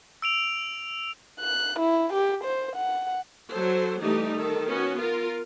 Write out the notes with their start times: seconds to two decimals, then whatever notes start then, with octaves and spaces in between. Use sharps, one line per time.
0.22 E6 D7 F7
1.40 F#6
1.79 E4
2.13 G4
2.44 C5
2.76 F#5
3.52 F#3 A4 C5
4.00 E3 G3 A3 D#4 G4
4.34 D#3 A4
4.67 B3 C#4 F#4
5.00 F4 A#4